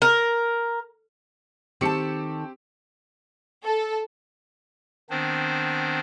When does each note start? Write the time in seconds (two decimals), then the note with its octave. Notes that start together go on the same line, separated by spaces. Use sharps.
0.02 A#4
1.81 D#3 C4 G4 A4 A5 C#7
3.64 A4
5.10 D#3 B3 C4 D4 C5